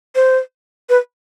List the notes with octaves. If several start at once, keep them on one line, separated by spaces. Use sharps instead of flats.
C5
B4